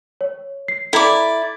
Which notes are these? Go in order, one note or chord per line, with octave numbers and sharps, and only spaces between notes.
C#5
C7
E4 A4 D5 A#5